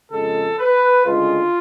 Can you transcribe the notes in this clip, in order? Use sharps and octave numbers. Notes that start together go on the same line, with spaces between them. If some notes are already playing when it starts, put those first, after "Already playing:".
F2 C#3 G#3 A4
B4
D2 C#3 G#3 F4